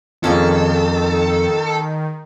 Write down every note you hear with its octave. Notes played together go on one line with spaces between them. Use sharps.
F2 D#3 G#3 A#3 C#4 A4